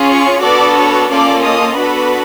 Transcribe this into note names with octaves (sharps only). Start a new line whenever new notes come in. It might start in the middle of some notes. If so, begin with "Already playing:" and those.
Already playing: C#4 F4 G#4
C#5 C#6
B3 D4 F#4 A4 D5 D6
C#5 C#6
A#3 C#4 F4 A4 D5 D6
D#5 D#6
B3 D4 F#4 A4 B4 B5